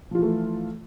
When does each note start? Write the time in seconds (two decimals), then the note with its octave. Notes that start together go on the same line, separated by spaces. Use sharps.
0.11 F3
0.15 F4
0.18 E3
0.22 A3